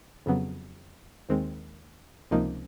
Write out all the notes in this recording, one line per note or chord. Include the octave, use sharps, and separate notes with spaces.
F2 C#3 F#3 B3
D#2 D#3 G#3 C4
C#2 C3 F3 A#3 D#4